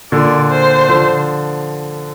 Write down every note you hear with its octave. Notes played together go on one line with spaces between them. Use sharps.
A#2 D3 D5
C5
D3 F3